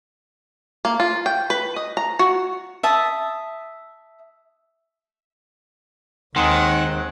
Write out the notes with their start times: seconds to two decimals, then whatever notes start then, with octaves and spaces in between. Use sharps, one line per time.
0.85 A#3
1.00 F4
1.26 G5
1.50 B4
1.76 D#5
1.97 A#5
2.19 F#4
2.83 E5 A5 D#6
6.36 D#2 D#3 G#3 C4 F#5